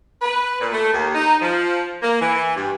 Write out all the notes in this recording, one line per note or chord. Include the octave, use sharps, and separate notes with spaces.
B4
A#2
A3
D#2
D#4
F3
A#3
E3
G2